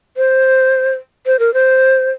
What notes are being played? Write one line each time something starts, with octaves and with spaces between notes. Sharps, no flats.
C5
C5
A#4
C5